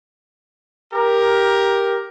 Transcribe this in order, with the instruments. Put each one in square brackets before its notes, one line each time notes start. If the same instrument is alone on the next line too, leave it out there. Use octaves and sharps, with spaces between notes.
[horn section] G4 A#4